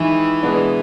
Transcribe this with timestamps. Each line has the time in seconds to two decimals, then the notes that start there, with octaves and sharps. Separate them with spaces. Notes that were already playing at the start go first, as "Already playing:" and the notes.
Already playing: D#3 E3 G#3 D#4
0.43 B2 G#3 B3 D4